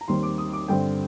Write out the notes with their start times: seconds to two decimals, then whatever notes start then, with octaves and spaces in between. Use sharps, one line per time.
0.01 A#5
0.08 D#2 D#3 G3 C4 C6
0.23 D6
0.38 D#6
0.53 D6
0.68 G2 D3 G3 C4 G5